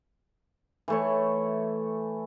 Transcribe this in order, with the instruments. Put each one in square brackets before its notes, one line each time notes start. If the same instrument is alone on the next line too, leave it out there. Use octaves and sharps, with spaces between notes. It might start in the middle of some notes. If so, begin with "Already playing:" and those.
[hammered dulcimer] E3 A3 C#5